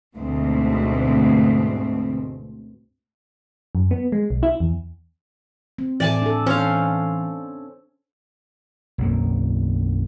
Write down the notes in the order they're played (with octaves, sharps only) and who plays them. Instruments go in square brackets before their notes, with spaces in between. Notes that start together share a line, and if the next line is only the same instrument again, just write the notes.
[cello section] D2 G#2 B2 C4
[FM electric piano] F#2
B3
G#3
B1
E4
E2
[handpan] C4
[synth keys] A2 E3 [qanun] D5 G#5 A5
[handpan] D4 A4
[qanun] C#4 F5 [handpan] C5
[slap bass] B1 F#2 A#3